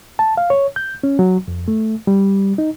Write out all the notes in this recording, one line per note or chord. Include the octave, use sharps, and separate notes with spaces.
A5
F5
C#5
G6
C#4
F#3
F2
A3
G3
D#4